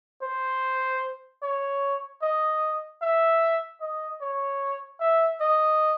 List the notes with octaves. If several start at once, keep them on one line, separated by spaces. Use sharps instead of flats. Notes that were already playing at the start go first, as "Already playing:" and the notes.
C5
C#5
D#5
E5
D#5
C#5
E5
D#5